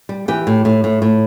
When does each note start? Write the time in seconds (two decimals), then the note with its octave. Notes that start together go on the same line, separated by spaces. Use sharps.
0.09 G3
0.28 E3 G4 G5
0.47 A2
0.65 A2
0.84 A2
1.02 A2